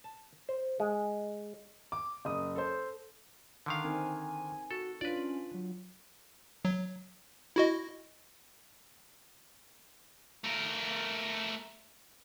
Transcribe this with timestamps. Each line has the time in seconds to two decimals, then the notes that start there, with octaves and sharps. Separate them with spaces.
0.04 A5
0.49 C5
0.80 G#3
1.92 D6
2.25 F#1 D#6
2.56 A4 C5
3.66 D3 D#3 F5
3.84 C4 D#4 A#4 G#5
4.71 F#4 A4
5.01 C#4 D4 F4 B4 D5
5.54 F#3
6.65 F#3
7.56 E4 F#4 D#5
10.44 A3 A#4